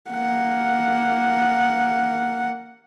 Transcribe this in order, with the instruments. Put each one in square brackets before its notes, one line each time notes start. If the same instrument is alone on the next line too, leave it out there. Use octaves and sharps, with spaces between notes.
[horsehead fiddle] A#3 F#5